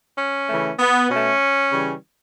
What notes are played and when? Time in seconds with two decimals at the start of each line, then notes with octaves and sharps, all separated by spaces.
0.18 C#4
0.49 C#3 E3 A3
0.79 B3
1.10 B2 A3 C#4
1.72 C#3 E3 G3